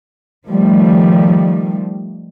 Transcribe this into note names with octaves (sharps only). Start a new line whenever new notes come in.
D#3 F3 G3 A3